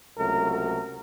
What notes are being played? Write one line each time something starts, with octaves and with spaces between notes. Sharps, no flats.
C#2 C3 F#3 A3 A#4
A#4